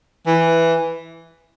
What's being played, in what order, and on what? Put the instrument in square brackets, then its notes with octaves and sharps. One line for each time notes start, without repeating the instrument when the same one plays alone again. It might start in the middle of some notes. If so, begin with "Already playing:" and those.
[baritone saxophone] E3